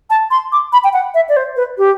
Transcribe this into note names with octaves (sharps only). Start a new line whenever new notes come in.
A5
C6
D6
B5
G5
F#5
E5
D5
C5
B4
G4